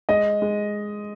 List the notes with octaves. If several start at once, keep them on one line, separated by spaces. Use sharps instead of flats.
G#3 D#5
G#3